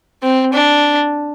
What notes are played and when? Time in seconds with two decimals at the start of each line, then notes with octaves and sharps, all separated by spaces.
0.23 C4
0.53 D4